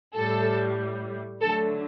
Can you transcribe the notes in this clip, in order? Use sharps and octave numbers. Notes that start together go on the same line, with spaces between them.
A2 G3 A4
D3 F#3 A3 A4